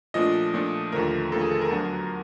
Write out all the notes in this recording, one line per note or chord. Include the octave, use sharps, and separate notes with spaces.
A#2 F3 A3 D4 D#5
A#2 F3 A3 D4
D#2 D3 F3 A3 A#4
D#2 D3 F3 A3 A4
G#4
A4
A#4
D2 D3 F#3 B3 D4